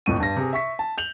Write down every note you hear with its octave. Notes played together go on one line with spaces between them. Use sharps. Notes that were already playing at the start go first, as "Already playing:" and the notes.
G1 F2 A2 C#6 D#7
G2 A#6
C3 G#4
E5 C#6 B6
A5
G6 F7 F#7